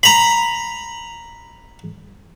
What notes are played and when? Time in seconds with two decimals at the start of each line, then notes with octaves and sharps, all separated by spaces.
0.03 A#5 B5